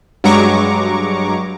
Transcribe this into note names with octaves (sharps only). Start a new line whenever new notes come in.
G2 F#3 G#3 A#5 C#6 D6